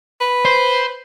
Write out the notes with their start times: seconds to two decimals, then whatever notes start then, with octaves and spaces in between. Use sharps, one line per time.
0.21 B4
0.45 C5